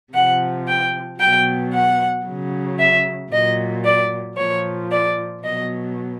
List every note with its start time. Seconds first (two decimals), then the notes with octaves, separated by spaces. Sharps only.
0.13 C3 F3 F#5
0.66 G5
1.19 B2 F#3 G5
1.72 F#5
2.26 C#3 F#3
2.78 E5
3.31 A#2 F#3 D#5
3.84 D5
4.37 A#2 F3 C#5
4.91 D5
5.43 B2 F#3 D#5